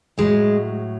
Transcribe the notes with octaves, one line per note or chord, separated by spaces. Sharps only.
A2 F#3 G#3